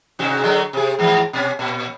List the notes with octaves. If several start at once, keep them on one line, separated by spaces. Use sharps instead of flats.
G#2 C3 F#4
D3 F#3 G#3
C3 G#4
G#2 E3 F3
B2 C#4
A#2